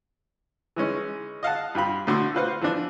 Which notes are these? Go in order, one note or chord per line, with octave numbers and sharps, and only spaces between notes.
E3 G#3 C#4 D#4
D#5 F5 F#5 A5
G2 F4 G4 B5
A2 D3 F#4 C6 E6
F4 F#4 B4 C5 F5 F#5
E3 F3 B3 D4